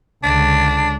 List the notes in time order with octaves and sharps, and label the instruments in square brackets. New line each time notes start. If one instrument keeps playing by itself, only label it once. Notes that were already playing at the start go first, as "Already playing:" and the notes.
[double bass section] C#2 D3 [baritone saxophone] D4